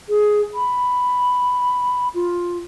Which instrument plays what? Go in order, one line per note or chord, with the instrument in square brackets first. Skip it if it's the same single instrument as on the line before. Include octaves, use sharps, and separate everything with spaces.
[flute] G#4
B5
F4